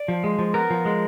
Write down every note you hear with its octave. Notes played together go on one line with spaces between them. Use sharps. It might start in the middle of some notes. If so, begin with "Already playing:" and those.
Already playing: D5
F3
G#3
F3
B3 A#4
F3
G#3